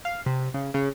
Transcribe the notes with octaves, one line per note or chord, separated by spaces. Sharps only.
F5
C3
C#3
C#3